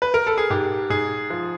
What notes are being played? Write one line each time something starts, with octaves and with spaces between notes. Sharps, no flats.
B4
A#4
A4
G#4
G#2 G4
G#2 G#4
F3